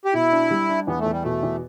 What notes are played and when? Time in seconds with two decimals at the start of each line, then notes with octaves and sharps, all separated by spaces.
0.05 G4
0.14 B2 E4
0.32 D4
0.51 G3
0.69 D4
0.87 E2 B3
0.99 A3
1.06 E2
1.11 G3
1.22 B2 A3
1.43 E2